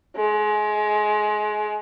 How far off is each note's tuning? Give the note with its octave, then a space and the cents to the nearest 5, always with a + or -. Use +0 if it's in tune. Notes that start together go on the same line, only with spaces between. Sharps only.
G#3 +25